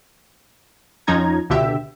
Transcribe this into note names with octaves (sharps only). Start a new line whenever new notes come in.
F2 F3 C#4 D#4 A#5 G#6
C#2 B2 D3 G4 E5